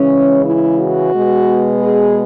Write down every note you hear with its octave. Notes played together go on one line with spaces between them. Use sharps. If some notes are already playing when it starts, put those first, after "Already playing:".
Already playing: C#3 E3 G#3 C#4
E4
F#4
B2 G#3 B3
G#4